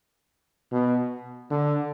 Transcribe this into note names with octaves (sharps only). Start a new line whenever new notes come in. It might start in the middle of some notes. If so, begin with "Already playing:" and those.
B2
D3